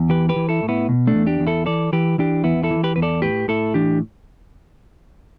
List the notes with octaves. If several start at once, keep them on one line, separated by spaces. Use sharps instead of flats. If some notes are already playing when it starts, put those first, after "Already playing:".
Already playing: E2
E3 G4 B4
G4 B4
E3
E4 A4
A2
B3 E4
B2
A3 D4
E2
D4 G4
E2
E4 A4
E3 A4 D5
E3 G4 B4
E3 D4 G4
E2 B3 E4
E4 A4
E3
G4 B4
E2 B4
A4 D5
A2 G4 B4
A2 E4 A4
E3 D4 G4